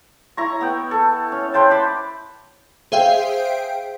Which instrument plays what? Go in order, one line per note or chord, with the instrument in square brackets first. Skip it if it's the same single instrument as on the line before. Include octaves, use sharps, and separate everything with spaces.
[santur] E4 A#5 C#6
B3 G5
A4
C#4
B4 C5 G5 A5
B5 D6
[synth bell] G#4 C5 E5 F5 G5